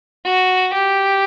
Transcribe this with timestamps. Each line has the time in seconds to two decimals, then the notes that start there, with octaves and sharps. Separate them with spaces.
0.25 F#4
0.73 G4